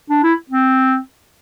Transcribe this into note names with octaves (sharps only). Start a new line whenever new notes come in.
D4
E4
C4